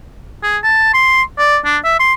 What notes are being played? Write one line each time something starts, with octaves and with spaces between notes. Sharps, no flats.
G#4
A5
C6
D5
D4
E5
C6